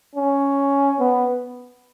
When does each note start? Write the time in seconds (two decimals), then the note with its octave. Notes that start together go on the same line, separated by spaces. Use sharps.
0.15 C#4
1.00 B3